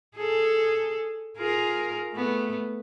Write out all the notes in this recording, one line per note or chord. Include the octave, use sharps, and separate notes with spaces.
G#4 A4
F4 G#4 A#4
A3 B3